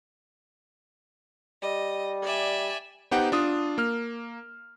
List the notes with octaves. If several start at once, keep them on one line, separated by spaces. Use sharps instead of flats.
G3 D#5
D5 E5 G#5
B3 D#4 G4 C5 F#5 G5
D4 F4 D#6
A#3 F6